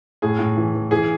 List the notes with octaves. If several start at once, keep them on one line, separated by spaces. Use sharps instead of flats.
A2 G#4
A2
E3
E3
E3 G#4